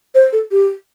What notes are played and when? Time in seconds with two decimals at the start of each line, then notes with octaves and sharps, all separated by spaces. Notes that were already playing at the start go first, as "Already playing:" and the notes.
0.15 C5
0.32 A4
0.51 G4